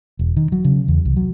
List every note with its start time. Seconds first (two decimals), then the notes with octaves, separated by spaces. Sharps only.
0.19 E1
0.37 D#3
0.52 F#3
0.64 C#3
0.88 E2
1.05 C2
1.16 F#3